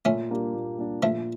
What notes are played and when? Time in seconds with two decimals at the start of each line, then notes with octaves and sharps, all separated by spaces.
0.05 A#2 A3 C#4
0.30 G3 A#3 D4 G4
0.55 A#2
0.78 G3 A#3 D4 G4
1.03 A#2 F3 A3